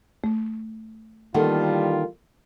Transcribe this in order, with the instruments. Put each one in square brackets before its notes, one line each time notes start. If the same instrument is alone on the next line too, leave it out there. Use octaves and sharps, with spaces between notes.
[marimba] A3
[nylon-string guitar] D#3 A#3 A4 [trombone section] E3 G3 F4 [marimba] F#5